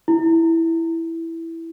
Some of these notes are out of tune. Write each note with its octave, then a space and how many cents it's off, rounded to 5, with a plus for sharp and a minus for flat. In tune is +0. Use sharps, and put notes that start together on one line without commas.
E4 +0